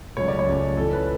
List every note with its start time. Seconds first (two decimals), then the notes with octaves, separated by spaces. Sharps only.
0.17 C#2 C#3 F#3 A3 C#5
0.28 D5
0.39 C#5
0.48 C#2 C#3 F#3 A3
0.77 C#2 C#3 E3 A4
0.93 B4